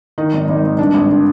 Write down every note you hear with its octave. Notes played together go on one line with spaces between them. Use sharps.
D#3 D#4
G#1
G#1
G#1
G2 D4
G#1
D3